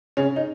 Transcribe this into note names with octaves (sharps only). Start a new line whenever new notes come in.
C#3 C#4
D#4